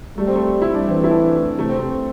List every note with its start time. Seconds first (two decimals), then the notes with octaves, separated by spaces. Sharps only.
0.18 G3 A3
0.27 C4
0.36 A3
0.62 E4
0.74 D4
0.88 E3 C4
1.04 E4
1.11 D4
1.36 A3
1.59 C3 A3
1.69 C4
1.79 A3